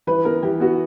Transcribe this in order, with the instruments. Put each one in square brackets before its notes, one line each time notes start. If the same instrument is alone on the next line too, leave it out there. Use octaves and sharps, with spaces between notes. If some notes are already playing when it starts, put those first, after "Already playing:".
[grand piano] E3 [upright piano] B4
[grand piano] B3 [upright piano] A#4
[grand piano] E3 [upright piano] G4
[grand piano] B3 [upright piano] F#4